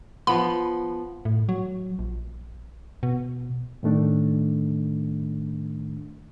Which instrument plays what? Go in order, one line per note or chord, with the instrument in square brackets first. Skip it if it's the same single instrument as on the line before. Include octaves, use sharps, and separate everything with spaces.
[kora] F3 B3 [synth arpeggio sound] B5
[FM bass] A2
F#3
A#1
B2
[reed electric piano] A2 D#3 A3 D4